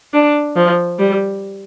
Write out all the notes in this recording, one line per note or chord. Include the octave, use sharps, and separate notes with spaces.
D4
F3
G3